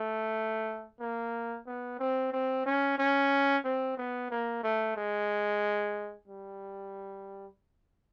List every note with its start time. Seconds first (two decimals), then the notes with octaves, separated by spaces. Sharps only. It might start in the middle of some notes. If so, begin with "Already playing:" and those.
Already playing: A3
1.00 A#3
1.67 B3
1.99 C4
2.32 C4
2.66 C#4
2.98 C#4
3.65 C4
3.97 B3
4.31 A#3
4.63 A3
4.97 G#3
6.28 G3